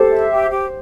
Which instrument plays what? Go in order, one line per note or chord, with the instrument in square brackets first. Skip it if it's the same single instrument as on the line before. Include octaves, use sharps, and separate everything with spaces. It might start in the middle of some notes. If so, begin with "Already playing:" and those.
Already playing: [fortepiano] G4 C5 [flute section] A4
[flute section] E5
G4
G4